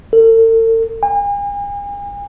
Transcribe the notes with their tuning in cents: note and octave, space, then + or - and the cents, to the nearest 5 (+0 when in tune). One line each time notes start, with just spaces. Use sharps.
A4 +45
G#5 -40